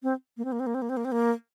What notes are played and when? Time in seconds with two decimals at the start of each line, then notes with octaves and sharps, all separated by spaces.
0.03 C4
0.37 A#3
0.45 C4
0.52 A#3
0.60 C4
0.67 A#3
0.74 C4
0.82 A#3
0.89 C4
0.97 A#3
1.05 C4
1.12 A#3